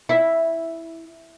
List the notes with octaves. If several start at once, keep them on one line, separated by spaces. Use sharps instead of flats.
E4